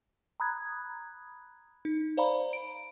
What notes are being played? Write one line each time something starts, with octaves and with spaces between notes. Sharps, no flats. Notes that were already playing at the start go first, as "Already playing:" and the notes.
A#5 B5 D#6 F#6 G#6
D#4
C5 D5 F5 A#5 B5
D7